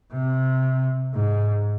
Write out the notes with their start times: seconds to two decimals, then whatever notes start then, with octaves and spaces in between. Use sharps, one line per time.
0.13 C3
1.14 G#2